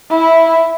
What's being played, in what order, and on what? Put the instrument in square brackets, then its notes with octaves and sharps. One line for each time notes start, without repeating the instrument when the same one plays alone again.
[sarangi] E4